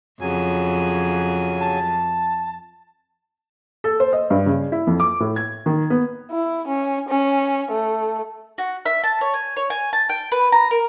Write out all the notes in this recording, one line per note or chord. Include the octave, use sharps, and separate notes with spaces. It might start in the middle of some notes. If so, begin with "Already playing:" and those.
F2 C#3 F#3 G#5
A5
A4
C5
D#5
G2
C#3
E4
F2
D6
A2
G#6
D#3
B3
E4
C#4
C#4
A3
F#4
E5
A5
C#5
G#5
C#5
G#5
A5
G5
B4
A#5
A#4